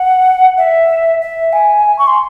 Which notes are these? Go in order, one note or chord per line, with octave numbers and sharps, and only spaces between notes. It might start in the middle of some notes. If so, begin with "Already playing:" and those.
Already playing: F#5
E5
E5
G#5
C#6
C6